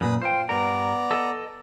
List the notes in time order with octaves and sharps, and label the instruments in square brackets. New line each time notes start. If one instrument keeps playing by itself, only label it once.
[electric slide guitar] F#2 A#2 [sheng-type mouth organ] B4 B5 D#6
[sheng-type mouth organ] F4 [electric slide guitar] C5 G5
[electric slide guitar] G2 A#4 [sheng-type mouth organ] B3 D5 A#5
[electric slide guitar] A4 D#5